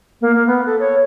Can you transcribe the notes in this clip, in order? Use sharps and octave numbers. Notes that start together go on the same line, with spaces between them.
A#3
A#3
B3
A4
C#5